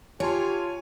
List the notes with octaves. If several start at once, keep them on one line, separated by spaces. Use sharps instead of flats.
F4 G4 C#5 G#5 A5 C6